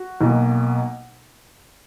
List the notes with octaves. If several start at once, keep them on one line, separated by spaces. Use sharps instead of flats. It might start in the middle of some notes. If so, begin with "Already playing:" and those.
Already playing: F#4
B1 B2 A#3